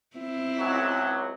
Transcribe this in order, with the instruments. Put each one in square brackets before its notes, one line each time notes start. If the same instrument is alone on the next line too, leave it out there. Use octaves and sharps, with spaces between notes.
[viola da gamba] C4 E4
[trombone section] C#2 F#3